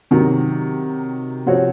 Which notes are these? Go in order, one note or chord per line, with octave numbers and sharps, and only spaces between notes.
C3 D#3 F#3
C3 F3 C4 F#4 C#5